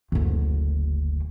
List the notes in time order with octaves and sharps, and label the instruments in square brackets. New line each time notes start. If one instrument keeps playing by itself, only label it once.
[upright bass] F#1 D2